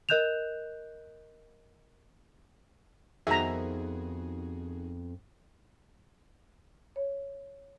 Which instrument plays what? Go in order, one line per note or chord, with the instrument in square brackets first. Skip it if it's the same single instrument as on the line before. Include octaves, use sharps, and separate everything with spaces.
[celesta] A#4 D#5 F#6 G6 E7 F7
[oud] F2 B3 [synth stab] D#3 F#4 G#4 [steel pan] E5 A#5
[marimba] C#5